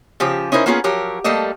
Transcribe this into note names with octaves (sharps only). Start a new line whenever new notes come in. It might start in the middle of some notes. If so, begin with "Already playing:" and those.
C#3 F3 G4
C#4 D#4 E4 A#4 C5
A#3 B3 C#4 F4 G4 G#4
F3 F#3 G4 A#4
G3 A3 A#3 A4 D#5